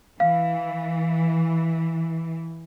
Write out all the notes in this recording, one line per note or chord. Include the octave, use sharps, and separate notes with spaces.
E3 F5